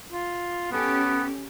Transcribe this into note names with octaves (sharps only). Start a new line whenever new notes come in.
F4
B3 C#4 G4 A4